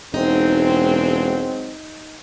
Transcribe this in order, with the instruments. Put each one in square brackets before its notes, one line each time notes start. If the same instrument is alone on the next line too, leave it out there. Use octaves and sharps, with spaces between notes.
[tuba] E1 [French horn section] F#3 G#3 C4 [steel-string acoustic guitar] D#4